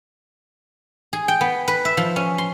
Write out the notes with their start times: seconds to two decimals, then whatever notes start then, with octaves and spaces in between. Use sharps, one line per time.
1.13 G#4
1.28 G5
1.41 B3
1.68 B4
1.85 E5
1.97 F3
2.16 C#4
2.38 C6